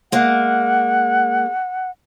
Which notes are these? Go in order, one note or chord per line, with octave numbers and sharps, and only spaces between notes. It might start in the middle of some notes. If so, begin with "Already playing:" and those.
G#3 A#3 F#5